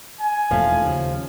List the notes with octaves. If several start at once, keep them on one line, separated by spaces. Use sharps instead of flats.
G#5
E1 D#2 F3 A3
D#2 C#3